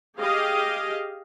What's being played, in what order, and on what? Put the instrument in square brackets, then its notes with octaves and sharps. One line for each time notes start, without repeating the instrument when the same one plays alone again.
[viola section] G4 G#4 D#5 F5